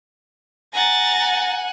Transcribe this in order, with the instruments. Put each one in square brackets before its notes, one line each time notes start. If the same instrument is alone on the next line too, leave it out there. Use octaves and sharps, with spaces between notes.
[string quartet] F#5 G#5 [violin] A#5 A6